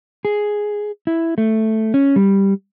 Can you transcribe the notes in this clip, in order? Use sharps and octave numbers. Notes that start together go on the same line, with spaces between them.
G#4
E4
A3
C#4
G3